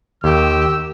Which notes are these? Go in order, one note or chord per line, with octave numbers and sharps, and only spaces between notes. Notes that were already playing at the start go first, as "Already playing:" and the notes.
D#2 D#3 G4 E6